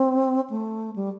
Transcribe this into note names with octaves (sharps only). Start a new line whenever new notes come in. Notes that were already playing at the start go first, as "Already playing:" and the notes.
Already playing: C4
A3
G3